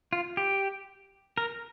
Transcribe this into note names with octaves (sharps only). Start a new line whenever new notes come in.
F4
G4
A#4